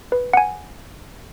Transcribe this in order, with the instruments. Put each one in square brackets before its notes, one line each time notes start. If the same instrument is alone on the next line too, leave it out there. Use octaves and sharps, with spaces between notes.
[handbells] B4
F#5
G#5